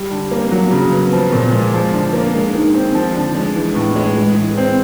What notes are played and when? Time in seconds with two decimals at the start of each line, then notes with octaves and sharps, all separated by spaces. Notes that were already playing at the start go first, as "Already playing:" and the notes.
Already playing: G3
0.11 D3
0.31 A#3
0.51 F#3
0.71 C#3
0.92 B3
1.13 F3
1.32 A#2
1.52 G#3
1.74 F3
1.93 D3
2.13 A#3
2.34 G#3
2.55 D#3
2.75 C4
2.95 F3
3.15 D3
3.35 G#3
3.55 E3
3.75 A2
3.96 G#3
4.17 G#3
4.36 E3
4.57 C4